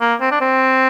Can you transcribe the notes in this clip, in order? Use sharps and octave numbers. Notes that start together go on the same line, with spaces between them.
A#3
C4
D4
C4